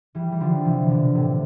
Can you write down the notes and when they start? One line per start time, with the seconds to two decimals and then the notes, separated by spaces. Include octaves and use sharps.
0.15 E3 G3
0.32 G3
0.40 D3 F3
0.65 C3 E3
0.89 B2 D3
1.15 A2 C3